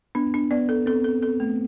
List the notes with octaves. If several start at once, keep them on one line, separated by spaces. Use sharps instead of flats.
B3 D4
D4
B3 D5
A4
C4 A4
A4
A4
A3